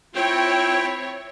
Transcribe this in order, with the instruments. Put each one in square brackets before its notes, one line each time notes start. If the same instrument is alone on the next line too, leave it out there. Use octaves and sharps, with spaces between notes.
[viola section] C4 C#5 [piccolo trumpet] E4 [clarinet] F4 [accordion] G5